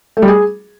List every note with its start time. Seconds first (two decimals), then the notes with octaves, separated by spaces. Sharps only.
0.17 A3
0.22 G3
0.28 G#4